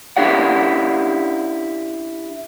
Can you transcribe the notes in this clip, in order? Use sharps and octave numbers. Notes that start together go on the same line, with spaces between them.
C#4 D4 E4 G4 D5 F#5